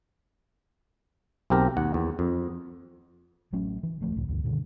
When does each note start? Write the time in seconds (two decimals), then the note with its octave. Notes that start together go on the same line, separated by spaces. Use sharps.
1.50 B1 C4 G4 A#4 A#5
1.77 D#2 F#5
1.94 E2
2.19 F2
3.53 A1 F#3 A3 C#4
3.83 E3
4.01 D#1 D2 F3 A3
4.16 C#2 A2 D3
4.28 D2 G2 D3
4.44 G2 B2 D3 D#3